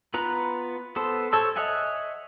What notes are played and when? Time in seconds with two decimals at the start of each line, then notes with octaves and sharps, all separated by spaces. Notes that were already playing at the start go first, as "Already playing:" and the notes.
0.14 B3 F4 B4 A#5
0.96 B3 A4 C5
1.33 A4 C5 C#5 A5 E6
1.56 C#5 D#5 E5 F#5 G#5